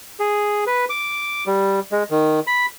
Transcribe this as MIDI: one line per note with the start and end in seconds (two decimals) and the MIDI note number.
0.20 0.64 68
0.67 0.85 71
0.90 1.44 86
1.47 1.80 55
1.92 2.03 56
2.10 2.40 51
2.47 2.66 83